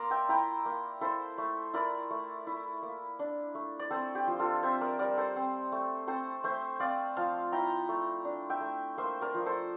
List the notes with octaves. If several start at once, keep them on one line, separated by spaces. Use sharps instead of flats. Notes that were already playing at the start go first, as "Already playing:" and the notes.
Already playing: A#3 D5 A#5 C6 D6 E6
E5 G5
E4 G5 A#5
A#3
E4 A4 C5
A3
E4 A#4 D5
A3
E4
A#3
D4
A3
D5
C4 A4 C5
G4
F3
F4 A4
C4 C5 E5
A#4 D5
G3 A#4 D5
A4 C5
C4
A3
C4 A4 C5
A3 C5 E5
C4 D5 F5
F3 F5 A5
E4 G5 A#5
A3
D4
E5 G5
A3
A#3 C5 E5
A#4 D5
F3
A4 C5